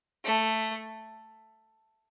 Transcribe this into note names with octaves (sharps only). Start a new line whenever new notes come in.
A3